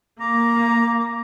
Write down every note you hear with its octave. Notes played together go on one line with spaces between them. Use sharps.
A#3 A#5 D6